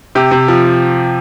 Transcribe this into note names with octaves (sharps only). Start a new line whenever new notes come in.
C3 G4
C3
F3